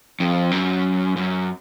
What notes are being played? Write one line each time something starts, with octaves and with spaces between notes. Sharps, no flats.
F2
F#2
F#2